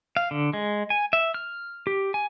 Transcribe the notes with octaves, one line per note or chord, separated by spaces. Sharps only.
F5
D3
G#3
G#5
E5
F6
G4
G#5